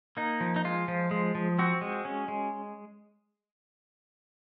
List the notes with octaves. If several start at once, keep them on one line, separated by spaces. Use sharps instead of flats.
A#3 D#4
F3
D#4
G#3 F4
F3
G#3
F3
C4 F#4
G#3
C#4
G#3